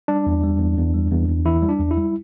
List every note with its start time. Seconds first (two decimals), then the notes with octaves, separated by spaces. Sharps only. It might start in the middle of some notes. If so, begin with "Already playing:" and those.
0.08 G3 D4
0.26 E2
0.43 G3
0.60 E2
0.77 E2
0.94 G3
1.11 E2
1.28 E2
1.45 E3 E4
1.62 G3
1.69 D4
1.79 E2
1.91 E4
1.97 G3